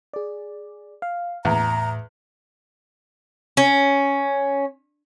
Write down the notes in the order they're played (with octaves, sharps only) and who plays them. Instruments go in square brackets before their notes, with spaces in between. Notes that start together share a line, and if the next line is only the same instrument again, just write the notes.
[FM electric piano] G#4 D5
F5
[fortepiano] E2 [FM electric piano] A2 [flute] A#5
[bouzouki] C#4